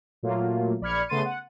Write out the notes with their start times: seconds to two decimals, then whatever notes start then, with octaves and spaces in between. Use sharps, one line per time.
0.23 A#2 F#3 A3 A#3 F4
0.81 A#1 D5 B5 F6 G#6 C#7
1.09 C#3 A3 B3 C6 A6 D#7
1.25 F#5